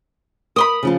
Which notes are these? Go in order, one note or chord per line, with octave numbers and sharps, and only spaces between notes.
A#4 B5 C6 D#6
C#3 F3 F4